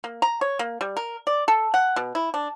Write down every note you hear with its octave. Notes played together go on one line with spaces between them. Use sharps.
A#3
A#5
C#5
A#3
G3
A#4
D5
A4
F#5
B2
E4
D4